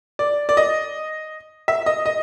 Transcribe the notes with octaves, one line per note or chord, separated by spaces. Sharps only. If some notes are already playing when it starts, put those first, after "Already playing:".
D5
D5
D#5
E5
D#5
D#5